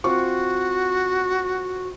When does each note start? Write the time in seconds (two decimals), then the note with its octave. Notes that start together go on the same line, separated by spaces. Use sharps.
0.04 C4 F4 F#4 C#6